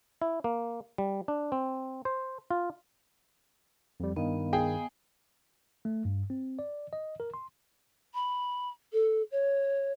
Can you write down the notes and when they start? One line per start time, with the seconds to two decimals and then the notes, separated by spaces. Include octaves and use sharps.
0.22 E4
0.44 A#3
0.98 G3
1.28 D4
1.52 C4
2.05 C5
2.50 F4
4.00 F2 G3
4.16 G2 D#3 B3 D#5 F5
4.53 G#4 G5
5.85 A3
6.05 G2
6.30 C4
6.59 D5
6.93 D#5
7.20 A#4
7.34 C6
8.14 B5
8.93 A4
9.31 C#5